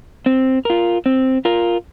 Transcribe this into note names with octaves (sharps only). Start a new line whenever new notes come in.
C4
F4 A#4
C4
F4 A#4